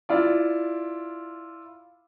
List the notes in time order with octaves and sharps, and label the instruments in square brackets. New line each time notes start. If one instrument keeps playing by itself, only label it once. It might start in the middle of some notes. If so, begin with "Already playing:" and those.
[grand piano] E4 F4 D5